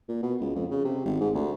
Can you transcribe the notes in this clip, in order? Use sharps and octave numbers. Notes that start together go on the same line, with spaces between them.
A#2
B2
C#2
F2
C#3
C3
G#1
G#2
D2